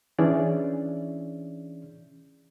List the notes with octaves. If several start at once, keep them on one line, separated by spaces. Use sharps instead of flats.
E3 C#4 D4 G#4 D5 E5